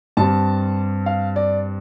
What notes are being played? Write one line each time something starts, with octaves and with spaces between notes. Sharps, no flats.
G2 G3 C4 A5
F5
D5